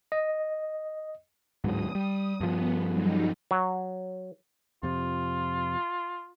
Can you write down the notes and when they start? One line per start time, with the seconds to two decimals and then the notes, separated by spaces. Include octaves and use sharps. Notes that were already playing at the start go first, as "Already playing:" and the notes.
0.12 D#5
1.64 D1 G#2 F#3 D#6
1.95 G3
2.40 G2 F3 B3
2.88 F#3 G3 D#4
3.51 F#3
4.83 F2 C3 F4